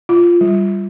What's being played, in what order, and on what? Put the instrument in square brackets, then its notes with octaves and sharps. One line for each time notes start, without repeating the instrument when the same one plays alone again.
[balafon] F4
G3